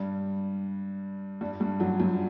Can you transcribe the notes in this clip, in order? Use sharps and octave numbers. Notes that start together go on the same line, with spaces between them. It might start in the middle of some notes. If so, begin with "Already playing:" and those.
Already playing: G2 G3
G2 G3
G2 G3
F#2 F#3
F#2 F#3